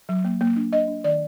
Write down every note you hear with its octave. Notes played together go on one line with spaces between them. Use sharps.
F#3
A#3
A#3
D4
D4 D#5
D4
D#3 D5